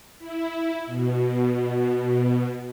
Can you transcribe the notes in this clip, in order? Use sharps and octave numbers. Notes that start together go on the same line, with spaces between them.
E4
B2